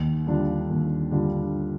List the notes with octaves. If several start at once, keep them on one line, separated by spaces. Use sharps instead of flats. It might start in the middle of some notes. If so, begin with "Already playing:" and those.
Already playing: D#2
D3 G3 D4 F4
D#2
D3 G3 D4 F4